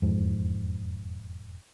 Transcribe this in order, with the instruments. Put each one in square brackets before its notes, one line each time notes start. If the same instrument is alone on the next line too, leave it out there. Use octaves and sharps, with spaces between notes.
[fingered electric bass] E1 F2 G#2